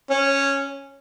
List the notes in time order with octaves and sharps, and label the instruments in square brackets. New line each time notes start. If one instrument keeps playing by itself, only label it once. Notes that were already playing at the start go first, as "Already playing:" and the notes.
[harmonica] C#4